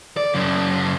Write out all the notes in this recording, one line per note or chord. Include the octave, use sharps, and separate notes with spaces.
D5
F#2 C#3